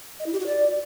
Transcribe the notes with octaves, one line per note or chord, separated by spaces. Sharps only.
D#5
E4
G4
F#4
D5